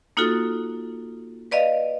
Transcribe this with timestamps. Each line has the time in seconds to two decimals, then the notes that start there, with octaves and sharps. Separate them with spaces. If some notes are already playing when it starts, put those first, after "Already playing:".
0.17 A#3 D#4 F4 F#4 A4
1.51 B4 D5 D#5 F5